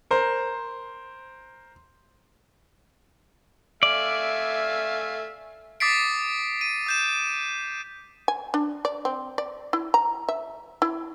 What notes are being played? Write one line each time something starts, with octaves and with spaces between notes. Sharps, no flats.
A#4 C5
A3 D5 E5 F5 G#5
D6 D#6 A6 B6 C7 D7
D#7
D#6 G6 E7
G#5
D4
D5
C4
D5
E4
A#5
E5
E4